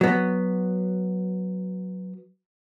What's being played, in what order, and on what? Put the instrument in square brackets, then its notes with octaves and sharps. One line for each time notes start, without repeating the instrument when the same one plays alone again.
[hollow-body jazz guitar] F#3 B3